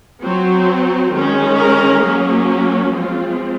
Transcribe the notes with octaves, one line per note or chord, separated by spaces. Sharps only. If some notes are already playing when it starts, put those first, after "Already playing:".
F#3 C4
D#3 G#3 C#4
A#4
F#3 A#3 C#4 G#4
F#4
F3 G#3 C4 F4